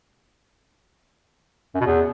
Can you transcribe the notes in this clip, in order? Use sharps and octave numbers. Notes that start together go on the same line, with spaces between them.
F#2
B2
E2